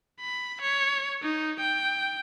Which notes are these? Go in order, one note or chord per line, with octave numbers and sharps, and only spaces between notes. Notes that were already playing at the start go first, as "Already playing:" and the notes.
B5
C#5
D#4
G5